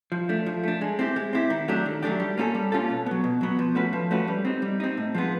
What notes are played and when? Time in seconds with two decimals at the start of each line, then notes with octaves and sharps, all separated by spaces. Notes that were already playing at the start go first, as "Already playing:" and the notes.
0.12 F3
0.29 A3 D4
0.46 F3
0.63 A3 D4
0.81 G#3
0.99 C4 E4 G4
1.16 G#3
1.33 C4 E4 G4
1.50 D#3
1.68 F#3 A3 D4 G4
1.86 D#3
2.03 F#3 A3 D4 G4
2.20 G3
2.37 A#3 C#4 F4 A4
2.55 G3
2.72 A#3 C#4 F4 A4
2.90 B2
3.06 F#3 B3
3.24 B2
3.41 F#3 B3
3.59 F3
3.75 A3 C#4 F#4 B4
3.93 F3
4.11 A3 C#4 F#4 B4
4.28 G3
4.45 C4 D#4
4.62 G3
4.80 C4 D#4
4.97 A2
5.14 F3 G#3 B3